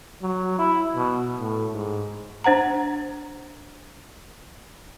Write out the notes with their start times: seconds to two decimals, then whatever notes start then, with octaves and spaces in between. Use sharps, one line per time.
0.22 F#3
0.59 E4
0.96 B2
1.40 A2
1.73 G#2
2.44 D4 C5 F#5 A#5